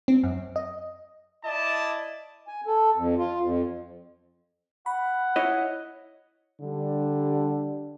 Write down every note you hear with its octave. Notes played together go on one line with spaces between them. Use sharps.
C4
F#2
D#5
E4 D5 D#5 A5
G#5
A4
F2
F4
F2
F#5 B5
E4 C#5 D#5
D3 G3 D4